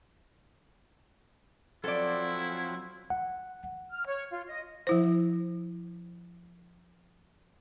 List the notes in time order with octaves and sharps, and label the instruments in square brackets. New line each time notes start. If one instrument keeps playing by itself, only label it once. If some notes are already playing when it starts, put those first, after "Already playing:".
[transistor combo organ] F3 F#3 C4 [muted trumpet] E4 [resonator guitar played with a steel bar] A4 D5
[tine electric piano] F#5
[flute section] F6
C#5
F4
D#5
[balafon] F3 E4 C5